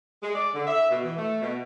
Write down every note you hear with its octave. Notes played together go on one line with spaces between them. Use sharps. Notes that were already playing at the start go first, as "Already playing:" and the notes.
G#3
D5
D3
E5
B2
E3
A3
B2